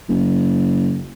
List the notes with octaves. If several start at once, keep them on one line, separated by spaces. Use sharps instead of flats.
F#1